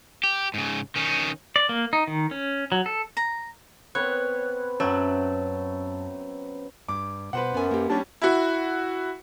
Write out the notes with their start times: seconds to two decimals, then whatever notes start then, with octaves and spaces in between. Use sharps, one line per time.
0.24 G4
0.54 G#2 C#3
0.96 D#3 C#4
1.56 D5
1.69 A#3
1.93 D#4
2.07 D#3
2.31 C#4
2.72 F#3
2.86 A4
3.17 A#5
3.95 B3 C4 B4 C#5 F#6
4.80 F#2 F#3 C#4 C#5 E5 A5
6.88 G2 D6
7.33 B2 B4 C5 F#5
7.54 F#2 B3 G#5
7.71 A#3 G4
7.90 G3 C#4 D4
8.22 E4 F#4